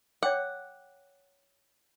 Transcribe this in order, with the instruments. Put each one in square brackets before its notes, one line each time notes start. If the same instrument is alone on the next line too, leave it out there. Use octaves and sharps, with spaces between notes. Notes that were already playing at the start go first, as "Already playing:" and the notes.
[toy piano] C#5 G5 D6 [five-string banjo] F#5